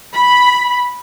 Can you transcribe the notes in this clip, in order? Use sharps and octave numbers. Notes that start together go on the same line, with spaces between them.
B5